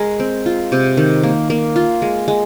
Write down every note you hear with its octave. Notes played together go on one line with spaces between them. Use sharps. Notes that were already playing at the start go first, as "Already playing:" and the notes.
Already playing: G#3 A#4
C4
F4
C3
D#3
A#3
A#3
F4
G#3
G#3